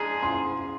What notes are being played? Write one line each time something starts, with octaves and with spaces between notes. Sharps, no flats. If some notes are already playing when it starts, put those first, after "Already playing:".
Already playing: F3 G#3 D4 G#4 A#5
C6